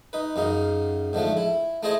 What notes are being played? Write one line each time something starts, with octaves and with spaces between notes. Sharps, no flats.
D#4 B4
F#2 C#3 C#4 D#4
G#2 D3 F3 A3
E4
A3 E4 G#4 C5 D#5